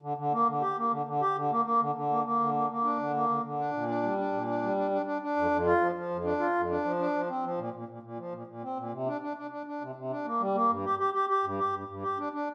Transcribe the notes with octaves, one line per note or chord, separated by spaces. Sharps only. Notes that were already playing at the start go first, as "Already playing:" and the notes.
D3
D3
A#3
D3
G4
A#3
D3
D3
G4
D3
A#3
A#3
D3
D3
A#3
A#3
D3
A#3
A#3
D4
D3
A#3
D3
D3
D4
A#2
D4
G3
D4
A#2
D4
G3
D4
D4
D4
D4
F2
F2
F4
F3
F3
F2
D4
F4
F2
D4
F3
D4
F3
C4
F3
A#2
A#2
A#2
A#2
F3
A#2
A#2
C4
A#2
C3
D4
D4
D4
D4
D4
C3
C3
D4
A#3
G3
A#3
G2
G4
G4
G4
G4
G2
G4
G2
G2
G4
D4
D4